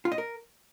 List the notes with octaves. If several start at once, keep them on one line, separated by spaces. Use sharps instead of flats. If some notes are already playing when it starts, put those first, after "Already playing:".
F4
D#5
A#4